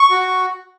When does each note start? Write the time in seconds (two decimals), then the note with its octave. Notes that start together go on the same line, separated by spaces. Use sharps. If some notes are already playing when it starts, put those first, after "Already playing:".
Already playing: C#6
0.11 F#4